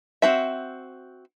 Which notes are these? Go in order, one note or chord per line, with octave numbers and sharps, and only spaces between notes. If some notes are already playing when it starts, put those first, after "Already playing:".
C4 F#4 E5